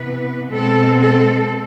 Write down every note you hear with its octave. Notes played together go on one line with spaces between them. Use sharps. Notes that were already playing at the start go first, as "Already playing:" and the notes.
Already playing: C3 E3 B3 B4
B2 G#3 C4 A4
A4